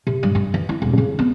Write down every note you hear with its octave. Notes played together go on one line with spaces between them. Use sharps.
C3
G2
G2
E3
E4
E1
C#3
B3